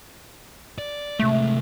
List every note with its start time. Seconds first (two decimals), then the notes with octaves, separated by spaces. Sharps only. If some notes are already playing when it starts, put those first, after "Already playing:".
0.78 D5
1.19 C3 G#3 A3